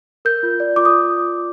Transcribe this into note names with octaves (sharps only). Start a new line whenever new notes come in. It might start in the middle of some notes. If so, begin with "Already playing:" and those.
A#4 G6
F4
D5
F4 D6
D#6